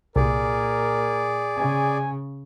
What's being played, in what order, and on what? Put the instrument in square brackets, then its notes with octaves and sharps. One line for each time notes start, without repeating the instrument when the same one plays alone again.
[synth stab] C2 [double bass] A#2 [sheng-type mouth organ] G#4 D5 [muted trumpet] A#4
[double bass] C#3 [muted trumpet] G#5